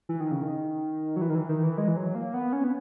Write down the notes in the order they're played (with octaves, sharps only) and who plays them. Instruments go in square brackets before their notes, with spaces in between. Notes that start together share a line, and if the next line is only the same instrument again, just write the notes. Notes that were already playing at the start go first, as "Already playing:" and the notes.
[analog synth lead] E3
D#3
C#3
D#3
F#3
E3
D#3
E3
D#3
E3
G#3
E3
F#3
A#3
B3
C#4
B3